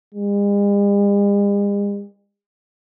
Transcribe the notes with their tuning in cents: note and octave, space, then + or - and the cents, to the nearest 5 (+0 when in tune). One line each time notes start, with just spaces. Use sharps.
G#3 -45